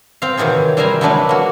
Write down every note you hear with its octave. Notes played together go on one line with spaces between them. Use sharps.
C4 F5
C3 D#3 E3 F#3 G#4
G3 E4 A#4 C5 G#5 A#5
F#3 G#3 A3 D4 E4 B4
A#3 F#4